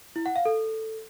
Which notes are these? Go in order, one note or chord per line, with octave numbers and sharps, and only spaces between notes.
E4
F#5
F5
A4